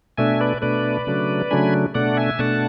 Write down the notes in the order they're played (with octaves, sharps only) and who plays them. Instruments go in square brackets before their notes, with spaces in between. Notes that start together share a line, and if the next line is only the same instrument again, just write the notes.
[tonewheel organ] B2 A3 D4 E5 G#5
B4 D5
B2 A3 D4 B4 D5
C#3 F#3 A3 D4
C#3 F#3 A3 D4 G#5 B5
B2 A3 D4 D5 F#5
E5 G#5
B2 A3 D4 F#5 A5